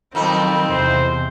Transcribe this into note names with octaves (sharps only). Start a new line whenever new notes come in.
F2 D#3 F#3 C4 D#4
E2 C3 C5